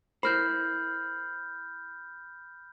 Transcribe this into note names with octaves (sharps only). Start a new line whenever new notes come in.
E4 A#4 C5 B5 F6 G6